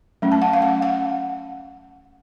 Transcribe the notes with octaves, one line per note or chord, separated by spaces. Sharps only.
F#3 A3 C#4
A5
F#5
F5
F#5
F#5